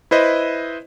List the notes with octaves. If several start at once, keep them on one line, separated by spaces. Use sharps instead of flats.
E4 B4 C5 D#5